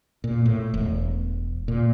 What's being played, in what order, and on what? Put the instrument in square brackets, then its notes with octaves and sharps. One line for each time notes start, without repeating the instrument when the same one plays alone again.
[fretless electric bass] A#2
A2
E1
A#2